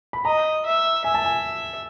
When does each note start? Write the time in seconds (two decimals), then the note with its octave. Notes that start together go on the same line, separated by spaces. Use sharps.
0.13 B5
0.25 D#5 A#5
0.65 E5
1.04 E5 G#5
1.14 A5
1.24 G#5